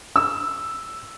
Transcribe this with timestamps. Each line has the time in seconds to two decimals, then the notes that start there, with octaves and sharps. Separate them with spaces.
0.16 E6